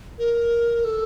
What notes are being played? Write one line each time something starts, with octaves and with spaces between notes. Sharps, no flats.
A#4
A4